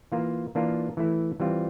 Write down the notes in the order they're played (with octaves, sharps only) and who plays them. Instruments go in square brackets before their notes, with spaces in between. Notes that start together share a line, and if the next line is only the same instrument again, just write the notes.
[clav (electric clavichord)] E3 A#3 F4
E3 A#3 D4 F4
E3 A3 E4
E3 G3 C4 F4